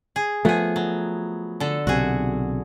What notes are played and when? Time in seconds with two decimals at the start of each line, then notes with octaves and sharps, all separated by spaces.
0.16 G#4
0.45 F3 A3 B3 G#4
0.76 F#3
1.60 D3 A4
1.87 B1 C3 F#4 G#4